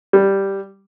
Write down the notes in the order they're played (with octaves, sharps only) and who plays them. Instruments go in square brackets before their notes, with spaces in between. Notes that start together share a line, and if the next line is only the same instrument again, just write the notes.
[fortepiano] G3